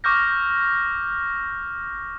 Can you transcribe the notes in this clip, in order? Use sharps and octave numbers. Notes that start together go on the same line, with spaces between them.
C#6 D6 E6 F6 G6 A#6